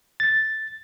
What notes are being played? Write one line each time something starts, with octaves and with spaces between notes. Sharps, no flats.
A6